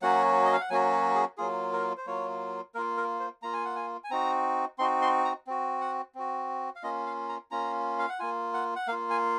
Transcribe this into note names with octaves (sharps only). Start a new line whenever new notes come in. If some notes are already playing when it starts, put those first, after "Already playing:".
F#3 A#3 C#4 F#4 F#5
D#5
F5
F#5
F#3 A#3 C#4 F#4 G#5
G#4
F#3 A#3 F4 G#4
A#4
C5
F#3 A#3 F4 C#5
A#3 F4 A#4
A#4
C5
A#3 F4 A#5
G#5
F#5
G#5
G#5
C4 D#4 F#4 A#5
C4 D#4 F#4 C6
C6
A#5
C4 F#4
F#5
C4 F#4
F5
A#3 C#4 F4 D#5
F5
A#5
A#3 C#4 F4 A#5
F5
F#5
A#3 F4 G#5
F#5
F#5
A#3 F4 F5
G#5